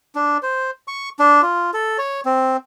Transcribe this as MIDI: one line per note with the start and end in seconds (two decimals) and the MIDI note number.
0.15 0.38 62
0.43 0.71 72
0.88 1.09 85
1.19 1.42 62
1.42 1.71 65
1.74 1.97 69
1.98 2.21 73
2.25 2.57 60